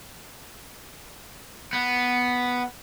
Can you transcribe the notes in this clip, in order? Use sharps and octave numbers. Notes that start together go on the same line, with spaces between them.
B3